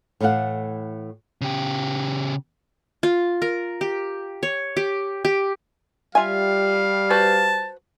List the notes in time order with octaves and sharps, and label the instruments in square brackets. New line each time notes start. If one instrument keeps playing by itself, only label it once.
[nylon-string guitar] A2 E3 A3 F5 F#5
[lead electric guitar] C#3 G4
[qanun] F4
A#4
G4
C#5
G4
G4
[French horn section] G3 [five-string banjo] F4 E5 G#5 [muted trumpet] F5
[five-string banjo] F#4 B4 C5 [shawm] A5